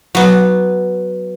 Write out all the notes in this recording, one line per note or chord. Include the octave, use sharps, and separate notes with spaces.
F#3 B3